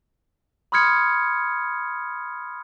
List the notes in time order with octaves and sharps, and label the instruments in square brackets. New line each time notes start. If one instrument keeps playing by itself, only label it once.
[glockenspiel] B5 C6 D#6 F6 G#6 C#7